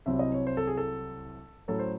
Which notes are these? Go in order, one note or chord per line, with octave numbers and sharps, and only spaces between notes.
C2 C3 F#3 C4 E4 E5
D#5
C#5
C5
A4
G#4
A4
A2 F#3 A3 C#4 E4 A4
C5